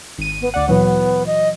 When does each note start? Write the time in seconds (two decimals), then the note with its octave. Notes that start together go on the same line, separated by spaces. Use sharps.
0.18 G#1 D#7
0.41 B3
0.54 D2 D5 F#5
0.69 A#2 E3 F#3 B3
1.26 D#5